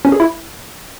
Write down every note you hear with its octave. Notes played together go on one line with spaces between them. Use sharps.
C#4
G#4
E4